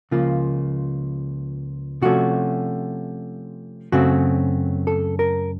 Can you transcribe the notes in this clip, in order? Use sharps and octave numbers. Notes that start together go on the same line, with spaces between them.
C#2 C#3 F3 A#3 F4
C3 F3 A3 C#4 F#4
F#2 C#3 A3 C4 F#4
A4
A#4